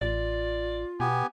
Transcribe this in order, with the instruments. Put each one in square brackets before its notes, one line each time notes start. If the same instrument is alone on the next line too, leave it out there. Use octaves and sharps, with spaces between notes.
[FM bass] A1 [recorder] F4 [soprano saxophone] D5
[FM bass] B2 [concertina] B3 G4 G#5